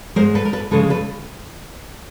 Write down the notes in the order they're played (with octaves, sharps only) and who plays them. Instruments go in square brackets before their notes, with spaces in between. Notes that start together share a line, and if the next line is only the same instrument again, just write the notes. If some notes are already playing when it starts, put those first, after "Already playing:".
[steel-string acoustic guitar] G#2 D#3 G#3 A#4 C5
A4 B4
A#4
A4 B4
D2 C#3 F3 G#3 A4 B4
A4 B4